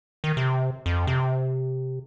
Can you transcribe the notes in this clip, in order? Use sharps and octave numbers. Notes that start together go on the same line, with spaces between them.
D#3
C3
F2
C3